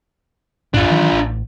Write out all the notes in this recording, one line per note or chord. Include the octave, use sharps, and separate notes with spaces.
B1 F#2 A2 D4 F4
D#3 E3 F#3
A1